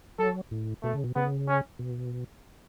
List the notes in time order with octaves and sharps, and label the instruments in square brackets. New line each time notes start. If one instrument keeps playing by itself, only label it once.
[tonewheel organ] F#3 [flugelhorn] A4
[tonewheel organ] A2
[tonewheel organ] B2 [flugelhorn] A3
[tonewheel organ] C#3
B2
[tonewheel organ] C#3 [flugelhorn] B3
[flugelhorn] C#4
[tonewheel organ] B2